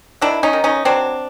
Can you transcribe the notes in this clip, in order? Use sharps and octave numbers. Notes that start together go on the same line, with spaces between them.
D#3 D4 E4
C#4 D#4
D#3
C#4 D#4
F#3 C4 D4